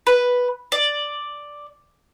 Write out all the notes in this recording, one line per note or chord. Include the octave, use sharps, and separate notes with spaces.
B4
D5